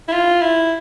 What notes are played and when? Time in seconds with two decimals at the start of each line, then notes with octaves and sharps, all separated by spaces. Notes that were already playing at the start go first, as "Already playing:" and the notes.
0.08 E4
0.13 F4
0.41 E4